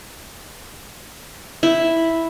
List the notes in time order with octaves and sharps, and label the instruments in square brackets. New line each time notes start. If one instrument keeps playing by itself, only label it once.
[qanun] E4